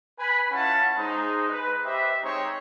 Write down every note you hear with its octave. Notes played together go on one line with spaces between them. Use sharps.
B4 G#5 B5
C#4 E4 F4 F#5 A5 B5
G#3 D#4 C5
B4
G4 B4 C5 D#5 E5
G#3 C4 D#4 C5 C#5 A#5